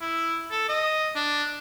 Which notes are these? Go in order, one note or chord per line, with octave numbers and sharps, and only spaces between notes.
E4
A4
D#5
D4